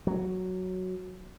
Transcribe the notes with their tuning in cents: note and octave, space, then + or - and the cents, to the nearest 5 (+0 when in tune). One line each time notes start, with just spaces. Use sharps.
F#3 +0